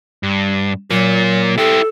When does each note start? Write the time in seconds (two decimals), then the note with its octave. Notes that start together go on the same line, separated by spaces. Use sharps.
0.23 G2
0.91 A#2 F#3 A#3
1.58 E4 G4 A4